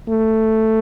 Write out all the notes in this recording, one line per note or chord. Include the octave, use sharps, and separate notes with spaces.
A3